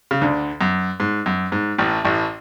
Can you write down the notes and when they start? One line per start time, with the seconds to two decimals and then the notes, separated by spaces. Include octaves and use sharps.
0.11 C#3
0.21 D2 D3
0.61 F#2
1.00 G#2
1.26 F#2
1.52 G#2
1.78 A1 A2
2.04 A1 A2